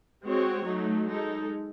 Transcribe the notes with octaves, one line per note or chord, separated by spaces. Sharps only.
G#3 C4 F#4 C#5
F#3 A3 D#4
G#3 D#4 A4